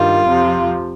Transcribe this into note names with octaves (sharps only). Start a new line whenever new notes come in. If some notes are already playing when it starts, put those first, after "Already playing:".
Already playing: G2 D#3 G3 F4
F2 C3 F3